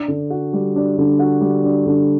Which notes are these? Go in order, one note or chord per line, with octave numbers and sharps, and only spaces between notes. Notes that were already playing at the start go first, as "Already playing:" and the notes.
Already playing: D4
D3
F#4
G3
D4
D3
F#4
G3
D4
D3